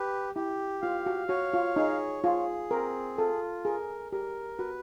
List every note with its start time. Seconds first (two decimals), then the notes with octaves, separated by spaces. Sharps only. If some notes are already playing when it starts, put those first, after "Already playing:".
Already playing: G4 B4
0.35 E4 G4
0.82 F4 F5
1.06 F#4
1.29 F#4 C#5
1.54 F4
1.76 D#4 G#4
2.24 F4 G#4
2.71 C4 A#4
3.17 F4 A4
3.64 G#4 A#4
4.12 G4 A#4
4.58 F#4 B4